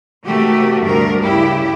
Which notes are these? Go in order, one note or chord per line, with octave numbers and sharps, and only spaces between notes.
C3 D#3 A3 F#4 G4
D2 G2 C3 A#4
G2 C#3 E4 G4